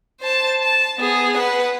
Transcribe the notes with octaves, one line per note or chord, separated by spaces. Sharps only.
C5 A5
A5
B3 G#4
B4 F#5